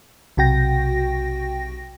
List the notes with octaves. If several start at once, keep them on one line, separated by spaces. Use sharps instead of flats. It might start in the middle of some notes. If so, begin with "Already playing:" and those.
B1 C3 F#4 G5 A#6